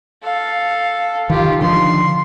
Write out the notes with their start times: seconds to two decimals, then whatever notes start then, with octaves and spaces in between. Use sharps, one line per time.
0.24 A4 F5
1.30 D#3 F4 G4
1.61 D3 D#3 F3 C6